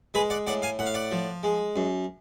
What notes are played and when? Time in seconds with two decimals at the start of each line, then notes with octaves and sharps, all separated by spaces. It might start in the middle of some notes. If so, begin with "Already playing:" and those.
0.14 G#3 G#4 B4
0.30 D5 F#5
0.47 A2 D5 F#5
0.62 F5 G#5
0.79 A2 F#5
0.86 F5
0.94 D5 F#5
1.11 F3
1.43 G#3
1.76 F#2